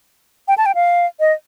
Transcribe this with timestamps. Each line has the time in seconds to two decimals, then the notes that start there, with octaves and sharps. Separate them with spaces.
0.48 G5
0.58 A5
0.66 G5
0.75 F5
1.20 D#5